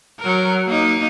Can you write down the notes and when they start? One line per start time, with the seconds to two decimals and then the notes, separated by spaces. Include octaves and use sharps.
0.20 F#3 A#4
0.67 A#3 D#4